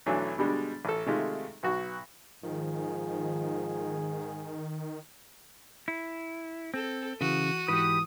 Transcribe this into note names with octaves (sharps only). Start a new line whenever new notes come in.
B1 E3 F#3 A3 D4 G#5
B2 D3 G3 G#3 D4
A1 A4
C3 D#3 G#3 A3 F4
B1 F#4
G#2 D#3 F3 G#4
E4
C4 A4
C#3 E3 F#4 D#7
G#2 E3 G4 B4 D#6